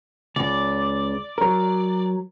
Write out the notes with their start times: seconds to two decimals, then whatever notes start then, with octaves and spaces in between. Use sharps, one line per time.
0.36 C#2 D5
1.38 F#3 A#4